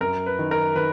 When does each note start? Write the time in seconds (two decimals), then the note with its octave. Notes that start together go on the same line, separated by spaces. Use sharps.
0.01 F#2 A#4
0.26 B4
0.39 D#3
0.51 A#4
0.75 D#3 B4